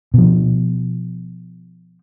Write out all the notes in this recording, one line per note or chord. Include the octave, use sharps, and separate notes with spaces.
B2 F3